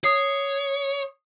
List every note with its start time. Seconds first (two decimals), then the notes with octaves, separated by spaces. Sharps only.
0.04 C#5 D#6 C7